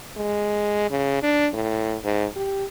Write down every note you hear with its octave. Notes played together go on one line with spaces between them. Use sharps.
G#3
C#3
D4
A2
G#2
G4